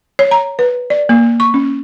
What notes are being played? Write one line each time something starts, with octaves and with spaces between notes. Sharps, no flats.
C#5
A#5
B4
D5
A#3
C#6
C#4